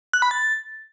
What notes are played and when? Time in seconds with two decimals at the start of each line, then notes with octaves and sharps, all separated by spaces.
0.13 F#6
0.22 B5
0.31 A6